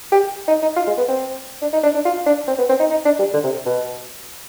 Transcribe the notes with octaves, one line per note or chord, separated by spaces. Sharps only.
G4
D#4
D#4
F4
G#3
B3
C4
D4
D#4
D4
D4
F4
D4
C4
B3
C4
D#4
D#4
D4
G3
D3
C3
B2